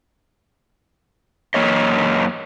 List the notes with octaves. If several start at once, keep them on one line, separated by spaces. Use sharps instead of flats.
F#2 A#3 C#5 D#5